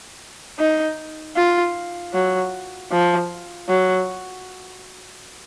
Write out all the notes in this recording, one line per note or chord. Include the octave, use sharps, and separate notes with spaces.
D#4
F4
F#3
F3
F#3